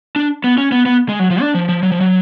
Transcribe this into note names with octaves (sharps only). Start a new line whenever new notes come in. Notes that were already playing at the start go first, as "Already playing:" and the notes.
D4
B3
C#4
B3
B3
G#3
F#3
F3
D4
F3
F3
F#3
F3
F#3